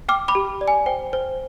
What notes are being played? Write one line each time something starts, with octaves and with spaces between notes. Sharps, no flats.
G5 D6 F6
B5 D6
G4
D5
G#5
C5 G5
C5